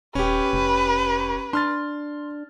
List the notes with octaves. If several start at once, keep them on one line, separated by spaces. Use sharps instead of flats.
D#1 C#4 G4 B4
F1
D4 C6 F6 A6